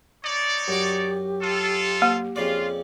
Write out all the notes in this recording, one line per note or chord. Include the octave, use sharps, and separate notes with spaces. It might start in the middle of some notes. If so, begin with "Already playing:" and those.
D#4 C#5 D5
F#2 F#4 G4
F4 A4
A#3
F2 C#3 F4 D5